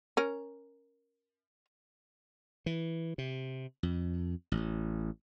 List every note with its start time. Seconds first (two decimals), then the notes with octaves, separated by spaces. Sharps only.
0.17 C#4 A#4
2.66 E3
3.18 C3
3.83 F2
4.52 A1